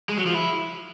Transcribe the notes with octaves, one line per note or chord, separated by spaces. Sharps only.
G#3
F#3
F3
E4